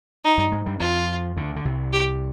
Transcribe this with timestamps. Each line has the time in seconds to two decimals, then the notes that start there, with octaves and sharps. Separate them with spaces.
0.24 D#4
0.38 G2 G3
0.52 G#2 G#3
0.66 G2 G3
0.80 F2 F3 F4
1.37 D2 D3
1.56 D3
1.65 C2 C3
1.92 G4